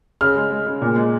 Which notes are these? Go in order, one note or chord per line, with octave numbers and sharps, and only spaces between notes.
C#3 F6
G#3
G#3
C#3
A#2
G#3